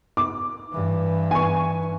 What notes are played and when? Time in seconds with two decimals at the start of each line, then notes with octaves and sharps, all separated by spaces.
0.17 D6
0.72 G2 E3
1.31 G#5 C#6